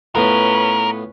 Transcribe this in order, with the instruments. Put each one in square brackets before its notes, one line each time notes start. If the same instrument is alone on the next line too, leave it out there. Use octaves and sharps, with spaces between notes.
[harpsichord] A2 B3 F4 [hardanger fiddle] C#4 B4 [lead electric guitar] A#4